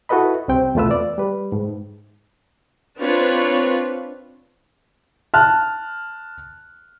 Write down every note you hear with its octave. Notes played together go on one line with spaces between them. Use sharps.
E4 F#4 A4 B4 D#5 B5
C2 C3 C4 G5
E2 B2 A3 F4 B4 E6
D5
G3 B4
G#2
C4 D4 F4 B4 C#5
A5 F6 F#6